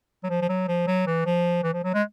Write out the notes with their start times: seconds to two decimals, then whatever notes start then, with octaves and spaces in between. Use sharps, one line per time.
0.24 F#3
0.30 F3
0.42 F3
0.49 F#3
0.68 F3
0.87 F#3
1.07 E3
1.26 F3
1.63 E3
1.74 F3
1.84 F#3
1.94 G#3